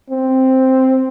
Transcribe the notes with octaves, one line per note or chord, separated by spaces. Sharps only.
C4